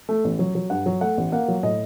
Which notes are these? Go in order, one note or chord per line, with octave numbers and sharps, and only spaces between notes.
A3
A1
F#3
F#3
G2 F#5
F#3
A3 F#5
A1
A#3 F#5
F#3
A2 D#5